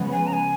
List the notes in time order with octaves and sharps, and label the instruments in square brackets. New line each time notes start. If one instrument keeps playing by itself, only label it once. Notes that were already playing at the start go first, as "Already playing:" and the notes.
Already playing: [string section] C#3 F3 G#3 B3
[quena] G#5
A#5
G#5